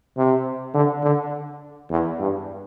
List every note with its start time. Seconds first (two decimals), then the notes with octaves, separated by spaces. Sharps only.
0.17 C3
0.74 D3
1.03 D3
1.90 E2
2.20 G2